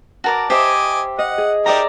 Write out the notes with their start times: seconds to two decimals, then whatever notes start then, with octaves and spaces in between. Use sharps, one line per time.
0.24 F#4 A#4 D5 A5 D6
0.50 G4 C5 D#5 E5 G#5 D6
1.19 D#5 F#5
1.38 G#4
1.66 D#4 G4 A#4 D5 E5 A#5